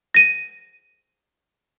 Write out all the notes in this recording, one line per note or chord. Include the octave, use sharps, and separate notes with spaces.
A#6 D#7